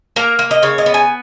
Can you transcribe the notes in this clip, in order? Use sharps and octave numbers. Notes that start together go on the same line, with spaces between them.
A#3 A#4
A#3
D#5
C#3 C#5
D#5
B3
G#5